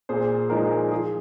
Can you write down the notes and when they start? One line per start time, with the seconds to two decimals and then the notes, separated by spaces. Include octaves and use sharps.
0.09 A#2 G#4 C5
0.50 F3 G#3 D#4 A#4
0.91 F3 G#4